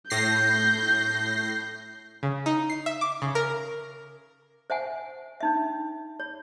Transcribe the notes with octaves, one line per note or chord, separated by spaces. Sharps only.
A2 G6 A#6 C7
C#3
D#4
C7
E5
D6
C#3
A#4
C5 E5 F#5 G#5
D4 D#4 E5
C#5